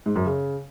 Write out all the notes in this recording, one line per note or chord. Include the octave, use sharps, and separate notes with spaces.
G#2
F#2
C#3